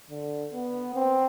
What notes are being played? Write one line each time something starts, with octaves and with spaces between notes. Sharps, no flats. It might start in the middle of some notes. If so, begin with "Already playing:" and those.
D3
B3
C4